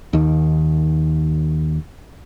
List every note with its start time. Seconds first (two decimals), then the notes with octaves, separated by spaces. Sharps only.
0.13 D#2 D#3